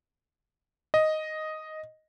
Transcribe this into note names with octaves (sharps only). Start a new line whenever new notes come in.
D#5